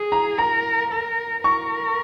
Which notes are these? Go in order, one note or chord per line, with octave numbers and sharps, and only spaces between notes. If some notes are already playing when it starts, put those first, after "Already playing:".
Already playing: G#4
A#5
A#4 A#5
A#4
A#4 C#6